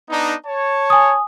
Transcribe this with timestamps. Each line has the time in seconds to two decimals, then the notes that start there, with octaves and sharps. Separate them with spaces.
0.10 B3 D4 D#4
0.46 C#5 A5
0.90 G#5 D#6